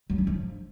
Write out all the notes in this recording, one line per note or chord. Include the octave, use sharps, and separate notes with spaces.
F#3
D4
F3